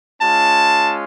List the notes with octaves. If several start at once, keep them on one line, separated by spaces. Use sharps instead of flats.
G#3 C#4 F4 A5